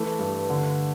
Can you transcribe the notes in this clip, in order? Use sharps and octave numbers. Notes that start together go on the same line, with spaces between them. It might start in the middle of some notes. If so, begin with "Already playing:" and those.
Already playing: E3 A3
G2
D3